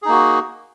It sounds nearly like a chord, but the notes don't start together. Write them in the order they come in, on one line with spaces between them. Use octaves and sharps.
G#4 D#4 A#3 F#4